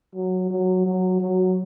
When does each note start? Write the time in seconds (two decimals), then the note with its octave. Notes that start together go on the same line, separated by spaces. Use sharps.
0.15 F#3
0.51 F#3
0.86 F#3
1.20 F#3